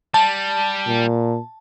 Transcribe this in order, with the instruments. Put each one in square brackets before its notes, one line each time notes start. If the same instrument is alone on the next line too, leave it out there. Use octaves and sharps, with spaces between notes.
[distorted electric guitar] G3 [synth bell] A5
[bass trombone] A#2